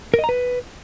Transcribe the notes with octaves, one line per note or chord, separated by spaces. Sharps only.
A#4
D#5
A#5
B4